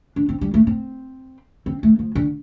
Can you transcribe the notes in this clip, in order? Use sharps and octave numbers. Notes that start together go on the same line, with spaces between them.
D4
C4
G3
A3
C4
C4
A3
F3
D3